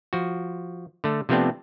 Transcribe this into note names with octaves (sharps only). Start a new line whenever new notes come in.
F3 F#4
D3 A3
C3 F3 A3 B3 C4 D4